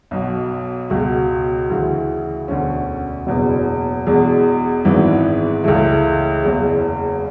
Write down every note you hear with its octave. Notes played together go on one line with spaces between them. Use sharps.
B1 B2
C#2 B2 F#4
D2 C#3 E3
E1 D2 D3 C#4
F#1 E2 B2 B3
E1 E2 B2 G#3
G#1 G#2 E3 B3
C#2 C#3 E3 A3
F#1 E2 C#3